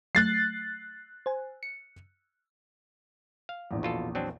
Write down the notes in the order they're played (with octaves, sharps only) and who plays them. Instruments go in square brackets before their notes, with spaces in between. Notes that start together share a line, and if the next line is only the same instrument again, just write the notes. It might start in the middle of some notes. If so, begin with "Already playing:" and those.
[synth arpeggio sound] F#3 A3 [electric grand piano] F#6 A6 C7
[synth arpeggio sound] C5 G#5
C#7
[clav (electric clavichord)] F5
[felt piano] A#1 E2
[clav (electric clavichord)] B2 F4 A4
F#3 C4 D4